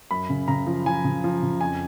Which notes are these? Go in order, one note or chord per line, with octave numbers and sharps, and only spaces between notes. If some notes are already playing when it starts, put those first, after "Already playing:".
F#2 B5
C#3
C#3 A#5
F3
F3 G#5
C#3
F3
C#3
F2 G#5